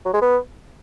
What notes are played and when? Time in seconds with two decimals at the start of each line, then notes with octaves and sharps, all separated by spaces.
0.05 F#3
0.14 G#3
0.22 B3